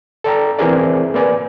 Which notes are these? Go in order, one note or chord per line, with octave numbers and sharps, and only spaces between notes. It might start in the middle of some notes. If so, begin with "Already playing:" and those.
A4 D5 G5 A#5
E3 C4 E4 G#4 A#4 D5
A#3 B4 D5 G#5